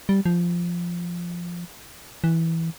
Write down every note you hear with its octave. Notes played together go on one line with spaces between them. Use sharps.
G3
F3
E3